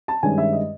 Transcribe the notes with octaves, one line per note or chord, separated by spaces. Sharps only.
A5
G2 D#3 G#3 C#4 G#5
E5
D#5